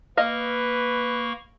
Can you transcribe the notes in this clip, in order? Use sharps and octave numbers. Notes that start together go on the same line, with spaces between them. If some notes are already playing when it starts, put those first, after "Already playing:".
A#3 B4 D#5 F5 C#6